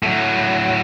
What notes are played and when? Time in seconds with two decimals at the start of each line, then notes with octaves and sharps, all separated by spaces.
0.03 A2 F#3